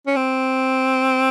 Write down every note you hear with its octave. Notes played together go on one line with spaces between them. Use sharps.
C#4
C4